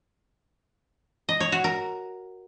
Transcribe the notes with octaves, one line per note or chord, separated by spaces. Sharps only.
D#5
C#5
F#4
A#4